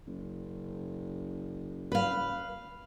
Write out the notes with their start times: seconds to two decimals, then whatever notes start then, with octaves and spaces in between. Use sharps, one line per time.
0.07 F#1
1.92 B4 F5